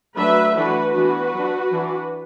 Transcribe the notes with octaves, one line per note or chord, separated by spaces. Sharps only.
F#3 A3 D4 B4 E5
E3 A3 D4 F#4 B4
E3 B3 D4 F#4 B4
F#3 D4
E3 D4